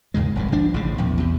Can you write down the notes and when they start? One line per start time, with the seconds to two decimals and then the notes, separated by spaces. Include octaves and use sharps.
0.14 D#2 G#2 C#3 G#3
0.35 F1 C2 A2
0.52 G1 F3 D4
0.74 A1 A2 C#3
0.98 A#1 E2
1.18 E2 C3